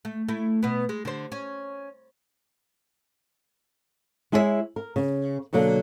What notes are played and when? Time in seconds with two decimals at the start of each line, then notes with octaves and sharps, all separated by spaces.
0.05 A3
0.28 A3 E4
0.63 B2 B3
0.89 G#3
1.05 D3 C5
1.32 C#4
4.32 G#3 E4 G#4 C#5 D5 E5
4.76 A#4
4.96 C#3
5.53 B2 D3 F#3 A#3